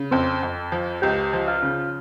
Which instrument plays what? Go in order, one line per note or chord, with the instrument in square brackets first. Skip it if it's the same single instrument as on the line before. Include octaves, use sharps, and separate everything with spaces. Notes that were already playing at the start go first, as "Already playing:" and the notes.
Already playing: [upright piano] C#3
[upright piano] F2 [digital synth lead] C4
[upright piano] F2
F3
[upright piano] C#2 [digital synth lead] G4
[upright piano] F3
[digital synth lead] F4
[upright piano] C#3